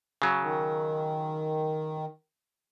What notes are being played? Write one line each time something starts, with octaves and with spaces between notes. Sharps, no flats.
C#3 F#3
D#3